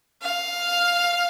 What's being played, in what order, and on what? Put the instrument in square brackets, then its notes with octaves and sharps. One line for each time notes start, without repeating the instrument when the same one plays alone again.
[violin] F5